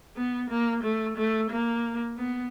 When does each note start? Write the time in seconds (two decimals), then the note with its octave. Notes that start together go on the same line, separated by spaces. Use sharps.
0.16 B3
0.50 A#3
0.83 A3
1.17 A3
1.50 A#3
2.17 B3